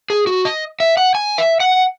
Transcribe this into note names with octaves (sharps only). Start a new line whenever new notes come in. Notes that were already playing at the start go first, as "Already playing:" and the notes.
G#4
F#4
D#5
E5
F#5
G#5
E5
F#5